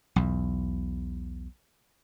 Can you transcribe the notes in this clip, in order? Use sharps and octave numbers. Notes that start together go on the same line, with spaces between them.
B1 E2